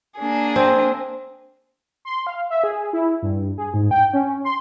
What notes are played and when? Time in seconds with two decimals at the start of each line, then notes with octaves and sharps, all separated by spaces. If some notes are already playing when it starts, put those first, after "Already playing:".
0.19 A#3 D4 G#4
0.56 C4
2.05 C6
2.27 F5
2.50 E5
2.64 G#4
2.93 E4
3.22 G2
3.58 G#4
3.74 G#2
3.91 G5
4.13 C#4
4.44 C6